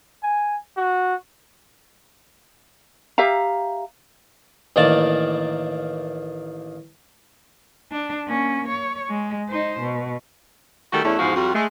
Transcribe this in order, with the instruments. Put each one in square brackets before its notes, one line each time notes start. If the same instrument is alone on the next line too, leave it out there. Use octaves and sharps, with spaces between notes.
[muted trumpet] G#5
F#4
[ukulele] G4 E5 F5 A#5
[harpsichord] A1 D#3 A#3 D5 A5
[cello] D4
A#3 C#4
C#5
G#3
D#4 C5
B2
[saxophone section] D#3 G3 A3 F#4 A4
E2 A3 C#4 D4 E4
E2 G#2 F3 F#4 G#4 F5
F2 G3 F4 F#4
G#3 A3